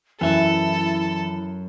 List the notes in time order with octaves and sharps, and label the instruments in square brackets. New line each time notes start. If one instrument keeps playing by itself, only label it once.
[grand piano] F#2 [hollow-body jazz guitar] E3 E5 [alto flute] E4 [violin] A4